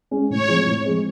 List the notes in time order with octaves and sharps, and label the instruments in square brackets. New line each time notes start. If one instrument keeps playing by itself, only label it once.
[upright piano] G#3 C#4
[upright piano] A2 [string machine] C#5
[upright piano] F3 G#3 C4
A2
F3 G#3 C4